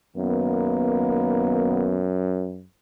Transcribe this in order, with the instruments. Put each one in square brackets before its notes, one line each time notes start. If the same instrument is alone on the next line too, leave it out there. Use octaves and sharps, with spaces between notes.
[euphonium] F#2 [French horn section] D#3 A#3 B3